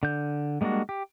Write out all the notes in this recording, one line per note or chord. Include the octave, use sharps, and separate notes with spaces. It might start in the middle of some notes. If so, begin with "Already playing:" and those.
D3 G6
G3 G#3 A#3 D4 F#4
G4